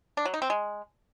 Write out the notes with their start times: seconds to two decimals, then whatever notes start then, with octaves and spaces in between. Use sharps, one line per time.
0.17 D4
0.25 F#3
0.34 D#4
0.42 C4
0.50 G#3